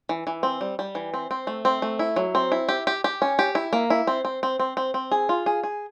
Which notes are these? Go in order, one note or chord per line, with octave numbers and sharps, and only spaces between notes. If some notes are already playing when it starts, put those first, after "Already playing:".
E3
E3
C4
G3
G3
E3
C4
C4
A3
C4
A3
E4
F#3
C4
E4
G4
G4
G4
C#4
G4
E4
A#3
E4
C4
C4
C4
C4
C4
C4
G#4
F4
G#4
G#4